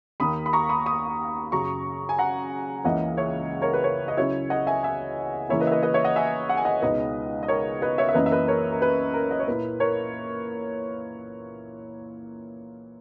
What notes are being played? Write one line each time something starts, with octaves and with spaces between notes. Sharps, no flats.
D#2 D#3 A#3 B5 D#6
B5
A#5 C#6
B5 D#6
B5 D#6
F#2 C#3 F#3 A#5 C#6
G#5
F#5 A#5
C#2 C#3 E3 A#3 C#4 D#5 F#5
C#5 E5
A#4 C#5
B4
A#4 C#5
D#5
C#3 F#3 C#4 E4 C#5 E5
D#5 F#5
E5 G#5
E5 G#5
C#3 E3 A#3 E4 C#5 E5
B4 D#5
E5
B4 D#5
B4 D#5
C#5 E5
D#5 F#5
E5 G#5
F#5
G#5
D#5 F#5
C#2 B2 G#3 D#4 B4 D#5
D#5
A#4 C#5
B4 D#5
C#5 E5
E5
F#2 E3 A#3 B4 D#5
E5
B4 D#5
A#4 C#5
A#4
B4
A#4
D#5
C#5
A#2 A#3 E4 B4
A#4 C#5